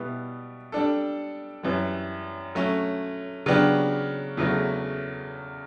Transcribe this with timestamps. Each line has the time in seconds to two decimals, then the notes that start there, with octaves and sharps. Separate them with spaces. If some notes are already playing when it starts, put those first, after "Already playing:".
Already playing: B2 G3 B3 E4
0.72 G3 D4 A4
1.63 F#2 E3 G3
2.55 F#3 A3 C#4
3.46 C#3 F#3 B3 D4 G4
4.37 E2 C#3 F#3 A3